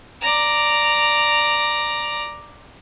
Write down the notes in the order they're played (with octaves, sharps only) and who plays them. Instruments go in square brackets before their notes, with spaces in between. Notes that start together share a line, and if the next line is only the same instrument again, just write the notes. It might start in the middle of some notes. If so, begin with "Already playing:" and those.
[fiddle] D5 A#5